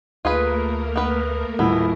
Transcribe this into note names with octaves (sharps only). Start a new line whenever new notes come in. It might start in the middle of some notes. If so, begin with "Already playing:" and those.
D2 A3 A#3 F4 G#4 A#4 B4
B3 B4
D#1 A2 B3 E4